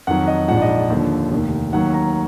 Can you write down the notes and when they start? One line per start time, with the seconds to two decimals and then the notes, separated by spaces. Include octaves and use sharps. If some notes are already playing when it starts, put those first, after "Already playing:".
0.07 F2 D#3 F#3 F#5
0.27 D#5
0.48 A#1 G#2 F3 F#5
0.57 D5
0.62 D#5
0.76 D#5
0.90 D#2 D3 F3
1.32 F1 D#2 D#3
1.73 D#2 D#3 F#3 F#5
1.94 A#5